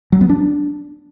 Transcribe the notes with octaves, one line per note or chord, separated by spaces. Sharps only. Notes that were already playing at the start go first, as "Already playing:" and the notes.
F#3
B3
D4